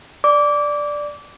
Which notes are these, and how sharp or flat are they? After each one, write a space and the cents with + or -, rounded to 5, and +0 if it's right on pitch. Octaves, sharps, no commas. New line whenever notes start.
D5 +0 D6 -20